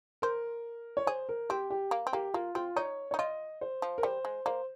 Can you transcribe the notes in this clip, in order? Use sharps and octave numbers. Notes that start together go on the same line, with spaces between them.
A#4 C5
C#5
G#4 C5
A#4
C4 G4
G4
A#3
C4
A#3 G4
A#3 F4
C4 F4
D#4 C#5
D#4 C#5
F4 D#5
C5
F3
A#4
G3 C5
G#3
A#3 C5